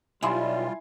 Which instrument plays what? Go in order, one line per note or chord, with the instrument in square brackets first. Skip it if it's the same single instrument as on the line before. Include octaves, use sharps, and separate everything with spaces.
[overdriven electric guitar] B1 [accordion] G3 F4 [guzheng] E4 [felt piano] G#5 C6